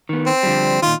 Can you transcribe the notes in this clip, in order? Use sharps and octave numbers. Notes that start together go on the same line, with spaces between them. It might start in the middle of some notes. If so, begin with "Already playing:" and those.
D#3 B3
C4
D3 F3 G3
A#2 D#3 F4